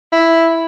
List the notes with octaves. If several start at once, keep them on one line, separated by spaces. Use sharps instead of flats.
E4